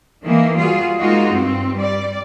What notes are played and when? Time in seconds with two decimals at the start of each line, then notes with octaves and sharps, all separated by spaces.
0.25 D#3 E3 A#3
0.57 G3 F4 F#4 G#4
0.98 G#3 A#3 D#4 F4 F#4
1.32 G2 C4
1.77 G3 D5